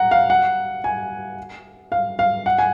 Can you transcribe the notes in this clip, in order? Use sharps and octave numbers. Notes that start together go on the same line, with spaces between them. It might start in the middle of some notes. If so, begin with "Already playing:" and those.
Already playing: F#5 A#5
F5
F#5
G#5
F5
F5
F#5
G#5